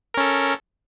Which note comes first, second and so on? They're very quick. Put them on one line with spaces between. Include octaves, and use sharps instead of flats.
A#4 C#4 A4